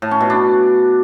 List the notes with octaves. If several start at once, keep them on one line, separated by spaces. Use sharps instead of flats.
A2
C#4
B2
D4